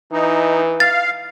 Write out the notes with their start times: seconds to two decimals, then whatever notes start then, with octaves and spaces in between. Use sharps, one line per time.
0.13 E3 D#4
0.80 F5 A6